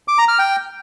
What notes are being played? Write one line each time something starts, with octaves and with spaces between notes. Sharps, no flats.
D6
A#5
F6
G5